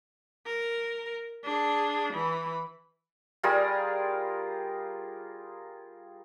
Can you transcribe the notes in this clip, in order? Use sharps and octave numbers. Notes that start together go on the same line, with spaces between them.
A#4
D4 G#4
E3 B5
G3 F4 G#4 A#4